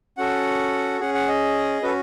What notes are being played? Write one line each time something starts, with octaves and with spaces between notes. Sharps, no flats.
C#4 F#4 A4 F#5
C#4 G#4 F#5
F#5
D#5
C#4 F#4 A4 B4